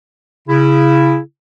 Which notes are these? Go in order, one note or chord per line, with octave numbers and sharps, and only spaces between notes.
C#3 E4